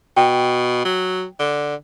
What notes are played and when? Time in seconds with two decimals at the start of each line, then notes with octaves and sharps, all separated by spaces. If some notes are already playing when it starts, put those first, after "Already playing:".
0.17 B2 G5
0.85 F#3
1.39 D3